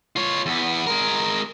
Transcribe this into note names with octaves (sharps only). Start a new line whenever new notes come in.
F4 C#5
E2 B3
G#3 A#4